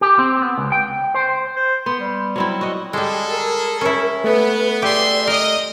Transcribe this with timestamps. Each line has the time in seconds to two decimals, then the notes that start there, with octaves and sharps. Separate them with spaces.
0.01 G4
0.19 C4
0.42 B3
0.58 C#2
0.72 G5
1.15 C5
1.56 C5
1.86 B3 C6
2.00 G3
2.36 F#3 C4 E4
2.61 F#4 D#5
2.93 G3 G#3 G#4 A4
3.30 A#4
3.81 C#4 E4
4.24 A3 B3 B4
4.82 G4 G#4 D5 E5 C6
5.27 A#4 D#5